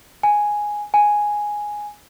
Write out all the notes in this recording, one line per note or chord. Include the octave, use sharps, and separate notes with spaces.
G#5
G#5